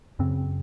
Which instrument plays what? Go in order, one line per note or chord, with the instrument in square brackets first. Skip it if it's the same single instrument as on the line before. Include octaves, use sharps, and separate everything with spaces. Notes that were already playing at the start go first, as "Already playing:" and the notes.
[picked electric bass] F#2 C#3 C4